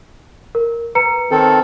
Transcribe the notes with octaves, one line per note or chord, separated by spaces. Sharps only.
A#4
B4 A#5 C#7
D#3 C4 A4